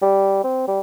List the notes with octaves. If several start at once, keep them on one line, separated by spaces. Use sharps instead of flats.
G3
C4
G3